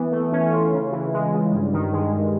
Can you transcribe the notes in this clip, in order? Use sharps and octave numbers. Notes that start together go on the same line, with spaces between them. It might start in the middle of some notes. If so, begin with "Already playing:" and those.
Already playing: E3 B3
A3
C#4
F4
C#3
E3
G#3
C#3
G2
D#3
G#3
G2